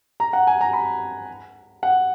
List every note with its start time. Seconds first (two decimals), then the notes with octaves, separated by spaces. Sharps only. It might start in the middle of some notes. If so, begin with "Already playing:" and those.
0.20 A#5
0.33 F#5
0.47 G#5
0.61 A#5
0.73 B5
1.83 F#5